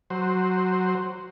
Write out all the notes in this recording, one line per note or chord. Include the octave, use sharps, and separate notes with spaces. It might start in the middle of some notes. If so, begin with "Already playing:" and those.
F#3 C5